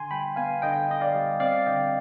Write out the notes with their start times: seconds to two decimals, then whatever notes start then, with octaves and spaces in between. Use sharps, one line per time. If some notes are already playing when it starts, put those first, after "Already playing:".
Already playing: D3 G#5 C6
0.11 G3 G5 B5
0.36 B3 F5 G#5
0.62 D3 D#5 G5
0.89 D3 D#5
1.01 D5 F5
1.14 G3
1.40 C4 D5 F5
1.66 D3 D#5 G5